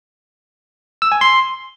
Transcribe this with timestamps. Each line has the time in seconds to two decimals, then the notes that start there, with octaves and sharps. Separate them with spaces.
1.02 E6
1.12 G#5
1.21 C6